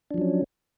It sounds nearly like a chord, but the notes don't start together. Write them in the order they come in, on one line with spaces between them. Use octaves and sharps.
D4 F3 F#3 C#4